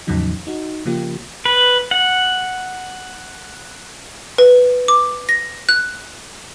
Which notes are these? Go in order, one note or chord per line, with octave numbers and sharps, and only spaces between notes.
E2 A2 C#3 F3 F#3 D#4
D#4 F#4
C#3 F3 A#3 F4 G4
B4
F#5
B4
D6
A#6
F#6